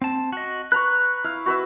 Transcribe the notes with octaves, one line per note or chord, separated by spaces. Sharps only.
C4 A5
F#4 D#5
B4 A#5 C#6 F#6
E4 F5
F#4 B4 E5